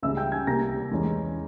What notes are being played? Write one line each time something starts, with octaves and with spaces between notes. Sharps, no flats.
C#2 C#3 G3 E5 E6
G5 G6
G#5 G#6
C2 C3 G3 A#3 A#5 A#6
E2 E3 G#3 C#4